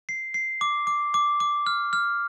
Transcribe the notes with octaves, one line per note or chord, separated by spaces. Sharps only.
C7
C7
D6
D6
D6
D6
F6
F6